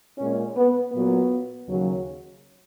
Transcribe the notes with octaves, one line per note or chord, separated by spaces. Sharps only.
A#2 G#3 C#4
B3
A#2 F#3 B3
D#2 C#3 F#3